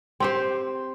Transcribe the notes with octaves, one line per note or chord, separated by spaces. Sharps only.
C4 G4 C5